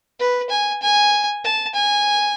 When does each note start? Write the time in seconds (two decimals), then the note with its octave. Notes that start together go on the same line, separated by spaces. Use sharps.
0.20 B4
0.50 G#5
0.82 G#5
1.45 A5
1.75 G#5